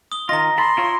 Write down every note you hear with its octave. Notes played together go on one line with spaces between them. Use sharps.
D#6 G7
D#3 F4 D#5 A#5 A#6
A4 A5 B5 C6
E4 F4 C#5